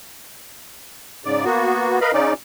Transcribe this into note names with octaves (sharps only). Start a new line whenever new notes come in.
G#2 C#3 D5
A#3 B3 F#4
A#4 B4 D#5 F5 B5
C#3 C#4 D#4 D5